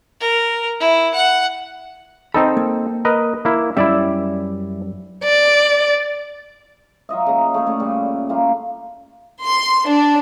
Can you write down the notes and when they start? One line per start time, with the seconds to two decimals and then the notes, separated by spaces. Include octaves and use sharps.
0.20 A#4
0.80 E4
1.14 F#5
2.34 C4 D#4 A4 C5 B5
2.57 A#3
3.05 A#4 B4 D#5
3.45 A#3 E4
3.77 F#2 G3 C#4 E4 D5 E5
5.24 D5
7.09 F#3 F4 D#5 E5
7.26 C#3 A#3
7.54 A3 G#4 C#5
7.66 A3 C#4 D5
7.80 A#2 C#3 G3
8.29 G3 A3 A#3 F4
9.43 C6
9.88 D4